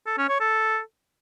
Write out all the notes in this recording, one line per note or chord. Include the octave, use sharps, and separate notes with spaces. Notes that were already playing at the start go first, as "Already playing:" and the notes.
A4
C#4
C#5
A4